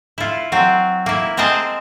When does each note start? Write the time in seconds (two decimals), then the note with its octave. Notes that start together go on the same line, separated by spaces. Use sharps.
0.18 E4 F4
0.52 F#3 C4
1.06 A#3 E4
1.37 G#3 C4 G#4 A#4 D#5 A5